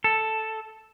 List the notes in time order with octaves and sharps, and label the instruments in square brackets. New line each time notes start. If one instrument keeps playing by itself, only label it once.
[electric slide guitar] A4